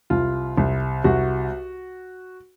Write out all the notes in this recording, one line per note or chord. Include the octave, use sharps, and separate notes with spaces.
C2 F4
C2
C2 F#4